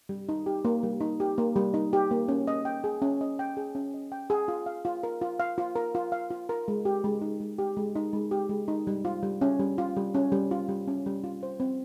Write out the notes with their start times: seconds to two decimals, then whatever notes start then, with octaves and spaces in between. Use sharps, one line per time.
0.09 G3
0.29 D#4
0.46 G4
0.65 A#3
0.83 G3
1.01 D#4
1.20 G4
1.38 A#3
1.56 G3
1.74 D#4
1.93 G4
2.11 A#3
2.28 C#4
2.47 D#5
2.65 G5
2.84 G#4
3.02 C#4
3.21 D#5
3.39 G5
3.57 G#4
3.75 C#4
3.94 D#5
4.12 G5
4.30 G#4
4.48 F4
4.66 F5
4.85 F4
5.03 A#4
5.21 F4
5.40 F5
5.58 F4
5.76 A#4
5.95 F4
6.12 F5
6.30 F4
6.49 A#4
6.68 G#3
6.85 G4
7.04 G#3
7.22 D#4
7.40 G#3
7.59 G4
7.77 G#3
7.96 D#4
8.13 G#3
8.31 G4
8.49 G#3
8.68 D#4
8.87 G3
9.05 F4
9.23 G3
9.41 C#4
9.59 G3
9.78 F4
9.96 G3
10.15 C#4
10.32 G3
10.51 F4
10.69 G3
10.88 C#4
11.06 G3
11.24 F4
11.43 C5
11.60 C4